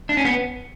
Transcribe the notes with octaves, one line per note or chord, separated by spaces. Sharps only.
D4
C#4
B3